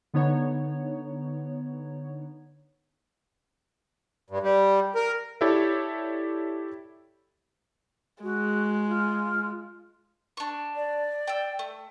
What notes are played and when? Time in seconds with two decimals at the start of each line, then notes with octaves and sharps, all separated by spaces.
0.14 D3 B3 D#4 C#5
4.30 G2
4.43 G3
4.95 A#4
5.41 E4 G4 A4 C#5 D5 E5
8.23 G#3 F#4
8.88 F4
10.37 D4 C#6
10.74 D5
11.27 G5 E6
11.59 A3